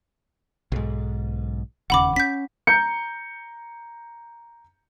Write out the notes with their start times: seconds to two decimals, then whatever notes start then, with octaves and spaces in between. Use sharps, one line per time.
0.72 B1 G#2
1.90 E1 D#2 C#3 F#5 B5 D6
2.16 C#4 G6 B6
2.67 A#5 G6 C#7